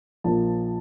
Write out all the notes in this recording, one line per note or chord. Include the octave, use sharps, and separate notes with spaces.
A#1 A#2 F3 A#3 A5